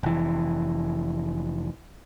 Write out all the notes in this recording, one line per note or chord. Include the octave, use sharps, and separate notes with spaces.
F1 E3